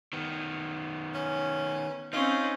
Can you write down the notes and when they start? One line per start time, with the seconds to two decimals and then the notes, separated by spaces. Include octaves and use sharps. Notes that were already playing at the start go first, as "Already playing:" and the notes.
0.13 D#3 B3
1.14 C#4
2.13 C4 C#4 D#4 F4